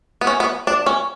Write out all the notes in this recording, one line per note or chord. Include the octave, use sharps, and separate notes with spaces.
B3
C#4
B3
D4
C#4